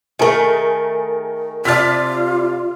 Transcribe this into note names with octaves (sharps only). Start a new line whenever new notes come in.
D#3 A3 G#4 A#4 G#5
C3 F4 D5 A5 F6 B6